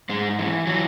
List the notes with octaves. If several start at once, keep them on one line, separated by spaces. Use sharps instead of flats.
G#2 G#3
E3
E3 F#3